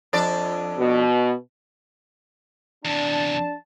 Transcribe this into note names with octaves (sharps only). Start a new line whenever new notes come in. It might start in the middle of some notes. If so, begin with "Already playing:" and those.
F2 D4 D5
B2
E2 C3 D4 A5